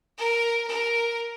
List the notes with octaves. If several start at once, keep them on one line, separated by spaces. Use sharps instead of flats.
A#4
A#4